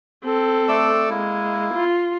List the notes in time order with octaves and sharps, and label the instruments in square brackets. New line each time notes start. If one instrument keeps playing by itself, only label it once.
[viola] C4 A4
[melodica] A3 D5 E6
[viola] G#3 [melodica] A#3 E4
[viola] F4